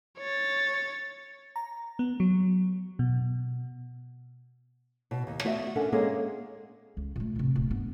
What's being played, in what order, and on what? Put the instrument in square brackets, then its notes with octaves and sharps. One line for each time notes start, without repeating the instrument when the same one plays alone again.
[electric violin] C#5 A6
[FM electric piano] A#5
B3
F#3
B2
[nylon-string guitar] B2
D#2
A3 B3 F#4 D5 E5
C#4 D4 A4 A#4 F#5
G#3 A#3 C4 C#4 G#4 A4
[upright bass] C#2
A#2 A3
A2 C3
D1 A#2
G2 B3